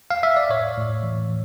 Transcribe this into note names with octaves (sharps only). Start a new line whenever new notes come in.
F5
E5
D5
A2 C#5
A2
E3